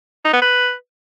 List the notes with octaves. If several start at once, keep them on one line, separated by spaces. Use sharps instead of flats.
D#4
B3
B4